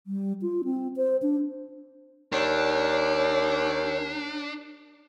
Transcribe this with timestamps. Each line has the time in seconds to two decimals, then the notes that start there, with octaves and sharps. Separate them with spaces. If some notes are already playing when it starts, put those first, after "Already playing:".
0.07 G3
0.42 F4
0.64 C4
0.96 C5
1.22 D4
2.32 D#2 D4 C#5